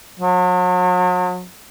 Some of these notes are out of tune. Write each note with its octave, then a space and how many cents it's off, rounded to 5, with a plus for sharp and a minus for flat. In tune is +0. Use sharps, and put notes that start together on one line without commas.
F#3 -40